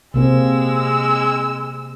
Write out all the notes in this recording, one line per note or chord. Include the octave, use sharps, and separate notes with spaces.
C3 G#3 A#3 C4 E6